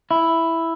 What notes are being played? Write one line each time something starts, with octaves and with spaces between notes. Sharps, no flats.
E4